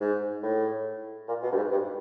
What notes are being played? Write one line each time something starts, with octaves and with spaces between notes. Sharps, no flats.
G#2
A2
A#2
B2
G2
G#2
G2